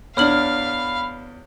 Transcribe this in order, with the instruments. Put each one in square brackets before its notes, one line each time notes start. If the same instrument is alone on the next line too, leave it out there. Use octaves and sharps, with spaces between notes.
[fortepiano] E2 D4 [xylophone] C#5 F6 F#7 [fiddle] F5 [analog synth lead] B5